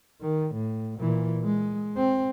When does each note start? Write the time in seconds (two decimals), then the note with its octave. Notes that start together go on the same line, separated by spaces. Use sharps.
0.21 D#3
0.55 A2
1.00 A#2 E3
1.44 G#3
1.97 C4